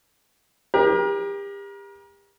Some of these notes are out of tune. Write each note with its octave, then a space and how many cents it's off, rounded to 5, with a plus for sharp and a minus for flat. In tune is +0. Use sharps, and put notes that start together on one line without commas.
G4 +35 A#4 +35